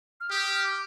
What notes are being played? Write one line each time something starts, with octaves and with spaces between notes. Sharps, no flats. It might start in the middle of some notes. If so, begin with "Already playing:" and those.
F6
G4 D#6
F6
D6